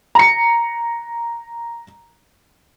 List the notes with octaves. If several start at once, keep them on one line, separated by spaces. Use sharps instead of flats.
A#5 C#7